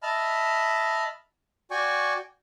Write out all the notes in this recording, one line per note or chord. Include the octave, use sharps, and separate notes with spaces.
D#5 E5 A5 B5 F6
F#4 D5 G5 G#5 C#6